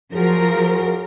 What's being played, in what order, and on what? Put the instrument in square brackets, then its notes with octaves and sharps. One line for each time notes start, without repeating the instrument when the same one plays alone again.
[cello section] F3 A#4 [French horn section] F#3 F#4 G#4